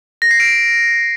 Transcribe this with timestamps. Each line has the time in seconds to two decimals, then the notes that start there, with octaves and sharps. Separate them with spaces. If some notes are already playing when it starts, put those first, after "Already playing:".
0.22 A#6
0.31 C7
0.40 D7